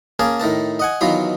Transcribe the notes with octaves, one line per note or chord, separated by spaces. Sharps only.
A#3 C#4 G#4 A#4 A5
A2 D#3 A#4 A5
D#5 F#5 G#5
B2 D#3 E3 F#3 F4 F5